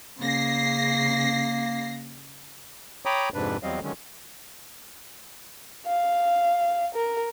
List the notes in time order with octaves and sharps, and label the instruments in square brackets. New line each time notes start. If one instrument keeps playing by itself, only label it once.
[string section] C#3 A#6 C7 [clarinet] A#3
[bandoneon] C#5 G5 A#5 B5 D6 D#6
F2 G#2 C3 D4 B4
E2 F#3 G3 C4 D#5 F5
D3 D#3 F#3 G#3 C#4
[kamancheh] F5
A#4